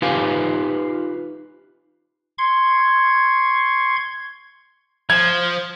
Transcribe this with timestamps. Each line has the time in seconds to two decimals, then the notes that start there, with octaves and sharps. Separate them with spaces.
0.02 D#4 F4 G4 B4 F5 G#5
2.38 C6 C#6 G#6
5.10 F3 G#6